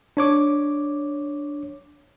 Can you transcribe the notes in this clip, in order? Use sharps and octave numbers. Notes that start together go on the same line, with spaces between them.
D4 C#5 D6